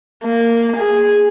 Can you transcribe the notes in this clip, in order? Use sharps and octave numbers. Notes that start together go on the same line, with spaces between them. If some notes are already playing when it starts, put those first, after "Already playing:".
A#3
G#4